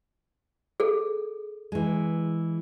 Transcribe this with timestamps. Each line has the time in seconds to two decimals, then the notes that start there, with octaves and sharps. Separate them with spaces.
0.80 G#4 A4
1.72 E3 G#3